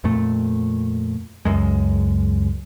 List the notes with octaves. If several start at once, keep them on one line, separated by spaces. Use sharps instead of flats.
F2 A#2 A3
C#2 F#2 G#3